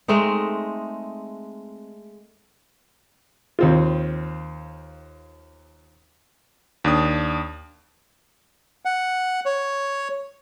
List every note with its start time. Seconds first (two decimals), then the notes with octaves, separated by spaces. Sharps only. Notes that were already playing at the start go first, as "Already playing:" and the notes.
0.08 G#3 A3 C4 D#4
3.59 D#2 C4 F4
6.84 D#2 D4 D#6
8.85 F#5
9.46 C#5